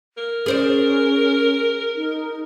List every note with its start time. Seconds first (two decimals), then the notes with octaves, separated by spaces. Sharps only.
0.17 A#4
0.46 C#4 G#4 C5 D5
1.96 D#4